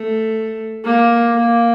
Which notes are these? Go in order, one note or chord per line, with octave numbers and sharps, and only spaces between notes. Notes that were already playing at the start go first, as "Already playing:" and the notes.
Already playing: A3
A#3
A#3